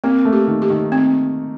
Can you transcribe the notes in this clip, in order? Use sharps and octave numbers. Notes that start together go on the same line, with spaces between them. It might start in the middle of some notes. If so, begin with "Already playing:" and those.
A#3 C4
A3
G4
D#3
G4
D#3
C4